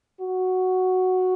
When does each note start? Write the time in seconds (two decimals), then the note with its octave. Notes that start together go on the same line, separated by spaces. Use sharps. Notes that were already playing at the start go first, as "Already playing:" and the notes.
0.21 F#4